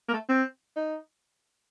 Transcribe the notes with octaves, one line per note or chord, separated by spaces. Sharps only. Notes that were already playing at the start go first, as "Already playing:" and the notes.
A#3
A3
C4
D#4